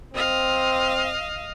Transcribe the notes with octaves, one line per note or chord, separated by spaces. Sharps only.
C4 D#5 F5